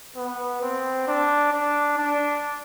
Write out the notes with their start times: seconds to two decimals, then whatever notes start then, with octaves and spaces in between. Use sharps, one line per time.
0.16 B3
0.62 C4
1.07 D4
1.52 D4
1.98 D4